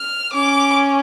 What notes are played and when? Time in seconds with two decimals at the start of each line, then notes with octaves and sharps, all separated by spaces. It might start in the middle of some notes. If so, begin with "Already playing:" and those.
Already playing: F6
0.34 C#4 D6